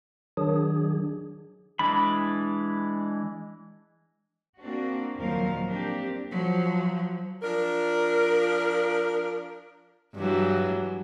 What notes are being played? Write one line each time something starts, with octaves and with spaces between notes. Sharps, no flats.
D#3 F#3 D4 G#4
E3 G#3 D4 B5
A#3 C4 D4 F#4
D#2 A#2 F3 F#3 A#4 F5
A#3 C4 D4 G4
F3 F#3
F3 D4 A#4
G2 E3 F#3